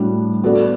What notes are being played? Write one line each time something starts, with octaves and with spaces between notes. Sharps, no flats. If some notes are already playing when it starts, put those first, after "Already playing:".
Already playing: A2 G3 D4 F#4
B3 F#4 A4 D5